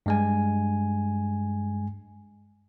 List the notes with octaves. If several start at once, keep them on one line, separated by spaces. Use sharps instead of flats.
G2 G#3 G#5